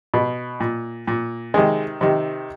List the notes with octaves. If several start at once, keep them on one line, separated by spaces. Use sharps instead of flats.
B2
A#2
A#2
C3 D#3 G#3
C3 D#3